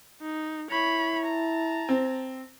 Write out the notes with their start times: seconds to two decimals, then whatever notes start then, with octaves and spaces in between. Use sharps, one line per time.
0.22 D#4
0.71 E4 C#5 B5
1.26 A5 A#5
1.89 C4